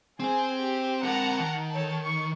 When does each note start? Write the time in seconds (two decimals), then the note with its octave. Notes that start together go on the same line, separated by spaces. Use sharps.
0.20 C4 G#4 C5
0.59 G4
1.03 C4 A#4 F#5 A5 A#5
1.39 D#3
1.71 A4 C#5 A5
2.03 C#6